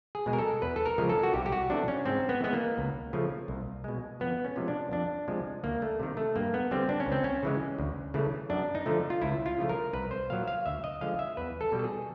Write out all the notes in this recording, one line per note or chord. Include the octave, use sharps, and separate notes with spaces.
G#4
B2 G#3
A#4
A4
E2 B4
A4
A#4
C#3 F3 G#3
A4
F#4
C2 G4
G4
F#4
C3 E3 A3 D4
C#4
G#2 C4
B3
E3 G#3 B3
A#3
C#2
C#3 F3 A3
C2
B2 G#3
F2 B3
C#4
C3 F3 G#3
D4
F2 D4
C3 F3 G#3
D2 A#3
A3
C3 D#3
A3
G2 A#3
B3
D3 G3 C4
D4
C#4
C#2
C4
C#4
C#3 E3 G#3
D2
C#3 E3 A3
F#2 D4
D#4
D3 F3 A3
F4
C#2 E4
F4
C#3 F3 A3
A#4
C2 B4
C5
A#2 F#3 F5
F5
D2 E5
D#5
D3 F3 G#3 F5
E5
E2 B4
A4
B2 G3
A4
G#4